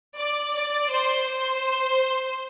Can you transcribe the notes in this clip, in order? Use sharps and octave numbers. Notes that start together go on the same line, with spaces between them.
D5
D5
C5
C5